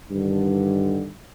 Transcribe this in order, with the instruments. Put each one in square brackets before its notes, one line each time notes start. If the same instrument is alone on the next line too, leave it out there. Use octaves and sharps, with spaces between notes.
[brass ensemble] G2 D3 D#3